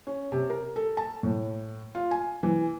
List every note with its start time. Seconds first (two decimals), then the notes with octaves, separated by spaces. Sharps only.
0.07 C#4
0.32 C3
0.50 A#4
0.76 A4
0.97 A5
1.23 A2
1.95 F4
2.11 G#5
2.43 E3